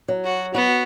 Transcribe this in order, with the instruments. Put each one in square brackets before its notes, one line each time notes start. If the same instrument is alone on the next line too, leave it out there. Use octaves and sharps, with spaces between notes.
[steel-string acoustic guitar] F#3
[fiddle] F#4
[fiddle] B3 [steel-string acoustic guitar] F#4